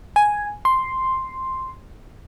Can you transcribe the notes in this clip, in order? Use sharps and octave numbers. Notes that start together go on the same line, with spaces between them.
G#5
C6